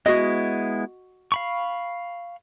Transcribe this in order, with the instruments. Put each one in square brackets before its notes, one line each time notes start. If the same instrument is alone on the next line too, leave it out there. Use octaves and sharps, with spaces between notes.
[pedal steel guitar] G#3 B3 E4 [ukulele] F#4 D#5
[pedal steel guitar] F5 B5 C#6